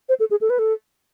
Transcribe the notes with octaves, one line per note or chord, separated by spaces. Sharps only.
C5
A4
G#4
A4
B4
A4